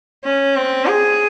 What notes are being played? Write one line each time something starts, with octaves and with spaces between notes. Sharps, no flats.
C#4
C4
G#4